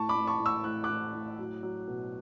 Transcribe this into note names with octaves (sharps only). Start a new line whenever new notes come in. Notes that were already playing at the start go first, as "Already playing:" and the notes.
Already playing: A2 A5 C#6
B5 D6
A2
A5 C#6
A2
C#6 E6
A2 F#6
D6 F#6
A2
A2
F#3
F#3
B2